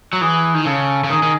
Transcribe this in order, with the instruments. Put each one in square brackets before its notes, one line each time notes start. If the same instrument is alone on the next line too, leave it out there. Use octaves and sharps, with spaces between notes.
[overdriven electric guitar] F#3
[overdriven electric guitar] E3 [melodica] G#4
[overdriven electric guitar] D#3
[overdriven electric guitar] C#3 [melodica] A4
[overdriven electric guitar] C#3
[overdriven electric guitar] D#3 [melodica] G#4
[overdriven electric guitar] D#3